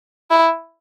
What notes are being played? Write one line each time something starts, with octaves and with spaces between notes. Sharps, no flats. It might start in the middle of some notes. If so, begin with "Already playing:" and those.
E4